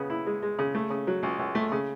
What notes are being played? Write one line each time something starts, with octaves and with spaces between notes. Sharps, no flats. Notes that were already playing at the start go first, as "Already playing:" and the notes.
Already playing: C#3 B3
E4
G#3
G#3
C#3
A3
C#3
F#3
C#2
C#2
A3
C#3